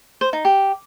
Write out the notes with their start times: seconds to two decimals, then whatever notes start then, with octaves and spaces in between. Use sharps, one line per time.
0.21 C5
0.33 D#4
0.45 G4